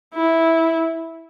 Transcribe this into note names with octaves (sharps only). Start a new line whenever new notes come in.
E4